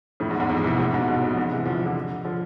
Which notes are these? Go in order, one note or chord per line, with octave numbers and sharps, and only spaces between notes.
F2 A2
E2 G#2
E2 G#2
F2
C3 E3
A2 C3
G#2 B2
G#2 B2
F2
E2 G#2
C3 E3
D3 F3
D3 F3
D3 F3